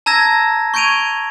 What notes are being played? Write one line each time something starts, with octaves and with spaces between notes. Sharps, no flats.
A5 A#5 E6 G#6 A#6
C#6 G6 G#6 D7 D#7 F7